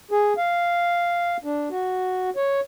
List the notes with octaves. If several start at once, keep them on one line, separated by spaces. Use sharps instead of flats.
G#4
F5
D4
F#4
C#5